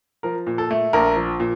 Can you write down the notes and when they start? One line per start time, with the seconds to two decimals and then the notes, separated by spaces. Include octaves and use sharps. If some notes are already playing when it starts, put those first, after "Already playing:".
0.23 F3 A#4
0.47 A#2
0.58 A4
0.71 A3
0.93 A#1 A#4
1.16 F3
1.40 A#2